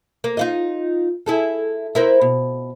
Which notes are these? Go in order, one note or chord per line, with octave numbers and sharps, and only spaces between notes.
A#3
D#4 F4 D#5
E4 G#4 A4
E4 A#4 C5
B2